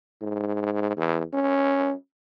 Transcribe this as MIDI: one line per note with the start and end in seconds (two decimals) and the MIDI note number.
0.21 0.93 44
0.97 1.22 40
1.34 1.94 61